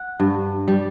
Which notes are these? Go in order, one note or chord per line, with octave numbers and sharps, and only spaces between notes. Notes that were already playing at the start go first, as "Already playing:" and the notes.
Already playing: F#5
G2
G3